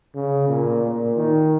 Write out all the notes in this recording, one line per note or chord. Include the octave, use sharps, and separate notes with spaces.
C#3
A#2
A#2
D#3